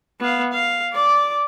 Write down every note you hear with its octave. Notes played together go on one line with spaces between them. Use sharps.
B3 F5
F5
D5 D6